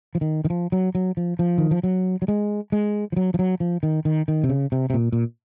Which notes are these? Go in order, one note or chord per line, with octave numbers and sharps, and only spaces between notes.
F3
D#3
D#3
F3
F#3
F#3
F3
F3
D#3
F3
F#3
F#3
G#3
G#3
F3
F#3
F3
F#3
F3
D#3
D#3
D#3
C3
C#3
C3
C3
A#2
A#2